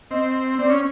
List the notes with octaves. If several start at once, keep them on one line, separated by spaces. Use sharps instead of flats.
C4 D#5
C4 D5
C#4